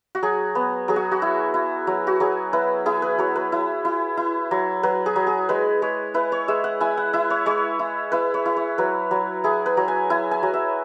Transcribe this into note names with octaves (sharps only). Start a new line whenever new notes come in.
F#4
F#3 G#4
B3
F#3 G#4
F#4
F#4
E4
E4
F#3
F#4
F#3 G#4
E4 B4
E4 G#4
B4
F#3 C#5
B4
E4
E4
E4
F#3
F#3 B4
G#4
F#3
G#4
G#3 B4
G#3 C#5
E4 B4
C#5
G#3 E5
F#5
E4 G#5
F#5
E4 E5
C#5
G#3 C#5
E4
E4 B4
C#5
E4
C#5
F#3 B4
F#3
E4 G#4
B4
F#3
G#5
E4 G#5
G#5
F#3
E5